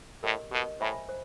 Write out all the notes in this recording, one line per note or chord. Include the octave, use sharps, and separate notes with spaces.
A2 G4 A#4 D#5
B2 G4 A#4 D#5
A2 C5 E5 G#5 B5
C5